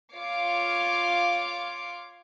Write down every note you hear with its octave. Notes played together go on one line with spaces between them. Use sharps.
F4 C#5 F5 D6 C7